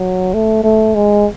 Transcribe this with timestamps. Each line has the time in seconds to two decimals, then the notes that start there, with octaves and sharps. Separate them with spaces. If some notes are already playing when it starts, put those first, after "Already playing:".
Already playing: F#3
0.34 A3
0.64 A3
0.95 G#3